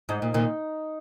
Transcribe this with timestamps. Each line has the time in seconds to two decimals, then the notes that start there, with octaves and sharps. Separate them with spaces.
0.09 G#2 D#4
0.22 A#2
0.34 A#2 D#3 D#4